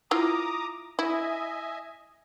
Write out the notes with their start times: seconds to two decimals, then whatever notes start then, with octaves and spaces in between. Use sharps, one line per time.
0.11 E4 F4 A#5 D6 D#6
0.99 E4 D#5 E5 G#5